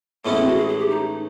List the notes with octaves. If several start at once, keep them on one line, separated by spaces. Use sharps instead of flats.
A2 E3 G#3 B3 C#4 E4
C4
F#4
G#4
G#4
G4
D#4